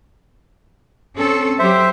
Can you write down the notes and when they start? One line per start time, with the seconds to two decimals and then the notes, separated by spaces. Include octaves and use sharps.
1.16 C4 C#4 A4
1.59 F#3 G4 C5 E5